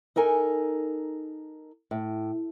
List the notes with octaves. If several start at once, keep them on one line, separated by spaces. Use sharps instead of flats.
D#4 A4 A#4 G#5
A2